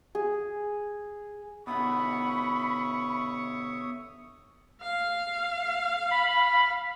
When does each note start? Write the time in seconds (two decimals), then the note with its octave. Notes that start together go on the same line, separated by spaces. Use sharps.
0.15 G#4
1.67 B2 D3 C#5 E5 B5 C#6 D#6
4.82 F5
6.11 B5